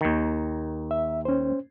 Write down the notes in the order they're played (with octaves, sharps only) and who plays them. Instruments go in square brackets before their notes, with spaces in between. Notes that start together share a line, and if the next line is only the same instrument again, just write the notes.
[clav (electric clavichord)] D#2 D#3
[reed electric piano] E5
C#4 C5